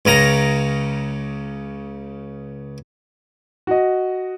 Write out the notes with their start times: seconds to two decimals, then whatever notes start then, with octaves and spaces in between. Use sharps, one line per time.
0.06 C#2 C#3 A#5
3.67 F#4 D#5